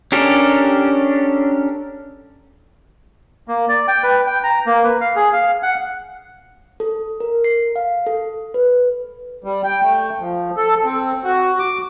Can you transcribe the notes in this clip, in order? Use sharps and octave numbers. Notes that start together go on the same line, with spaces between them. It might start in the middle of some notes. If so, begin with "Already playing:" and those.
C#4 D4 G4 A4 A#4
A#3
D5
G5
B4
G5
A#5
A#3
B4
F5
G#4
F5
F#5
A4
A#4
C7
F5
A4
B4
G3
G5
A3
F3
A4
C4
F#4
D6